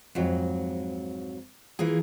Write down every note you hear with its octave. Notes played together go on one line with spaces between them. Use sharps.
F2 G#2 F#3
E3 A#3 F4 G#4